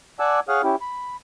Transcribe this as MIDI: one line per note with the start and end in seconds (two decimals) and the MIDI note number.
0.20 0.40 74
0.20 0.40 78
0.20 0.40 80
0.20 0.40 81
0.20 0.40 86
0.20 0.40 88
0.49 0.62 68
0.49 0.62 73
0.49 0.62 77
0.49 0.62 78
0.49 0.62 87
0.49 0.62 89
0.63 0.76 61
0.63 0.76 64
0.63 0.76 67
0.81 1.16 83